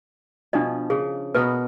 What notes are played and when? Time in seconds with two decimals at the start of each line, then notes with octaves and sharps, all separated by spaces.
0.53 B2 F3 D4 D#5
0.90 C#3 G#4
1.35 B2 B3 A#4 B4